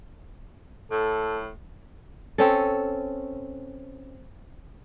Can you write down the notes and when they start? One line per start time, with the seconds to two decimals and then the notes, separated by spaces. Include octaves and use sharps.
0.91 A2 A4
2.38 C4 C#4 A4